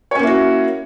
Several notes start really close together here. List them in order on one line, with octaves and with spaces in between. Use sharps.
C#5 C#4 A#3 E4 F#4